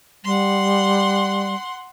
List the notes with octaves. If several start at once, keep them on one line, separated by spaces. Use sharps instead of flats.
G3 F#5 C6